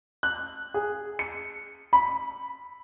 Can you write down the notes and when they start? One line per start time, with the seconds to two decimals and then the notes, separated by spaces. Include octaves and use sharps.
0.23 F#6
0.74 G#4
1.19 C#7
1.93 B5